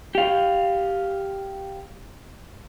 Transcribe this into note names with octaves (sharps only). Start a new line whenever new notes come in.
G4 F5